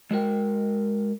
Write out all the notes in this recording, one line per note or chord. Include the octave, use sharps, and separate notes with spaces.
G#3 F#4 A#4 G5